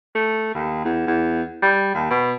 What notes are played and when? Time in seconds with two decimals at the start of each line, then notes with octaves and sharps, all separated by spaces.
0.15 A3
0.55 D#2
0.84 E2
1.07 E2
1.62 G3
1.94 D#2
2.10 B2